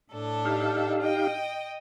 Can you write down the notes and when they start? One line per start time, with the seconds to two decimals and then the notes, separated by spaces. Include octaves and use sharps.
0.12 A2 D4 A4
0.45 D#4 G4 F5
1.00 D#5 G5